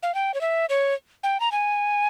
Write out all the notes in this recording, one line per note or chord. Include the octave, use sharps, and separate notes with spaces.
F5
G5
C#5
E5
C#5
G5
A#5
G#5